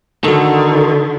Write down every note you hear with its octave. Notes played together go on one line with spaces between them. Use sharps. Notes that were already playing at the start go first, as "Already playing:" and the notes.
D3 D#3 F#4 A4